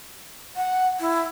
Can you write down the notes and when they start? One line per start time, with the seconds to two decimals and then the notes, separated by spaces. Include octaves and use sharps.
0.56 F#5
1.00 E4